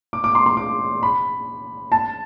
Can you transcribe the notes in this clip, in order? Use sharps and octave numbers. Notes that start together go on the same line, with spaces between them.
D6
D6
C6
C6
D6
B5
A5